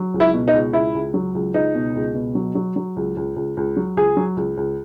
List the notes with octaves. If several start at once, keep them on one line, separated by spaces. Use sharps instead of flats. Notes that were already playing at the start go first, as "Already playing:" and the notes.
Already playing: F#3
C#2
E4
B2
D#4
C#2
C#2 E4
C#2
F#3
C#2
C#2 D#4
B2
C#2
B2
F#3
F#3
F#3
C#2
C#2
C#2
C#2
F#3
C#2 G#4
F#3
C#2
C#2